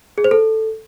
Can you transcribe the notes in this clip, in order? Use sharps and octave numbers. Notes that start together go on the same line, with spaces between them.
G#4
C5
A4